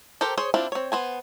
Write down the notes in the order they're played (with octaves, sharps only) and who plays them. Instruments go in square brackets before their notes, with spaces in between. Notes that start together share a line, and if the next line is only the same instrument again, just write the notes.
[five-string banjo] G4 A4 A#4 C5
G#4 C5 C#5
C4 D4 E4 F4
C4 C#5
B3 C5 G#5